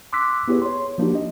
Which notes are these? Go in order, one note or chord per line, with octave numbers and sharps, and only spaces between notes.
C6 D6 E6 F#6 B6
B3 E4 G4 G#4 B4 C#5
C#5 C6
F3 A#3 D4 D#4 F#4 G4
D#5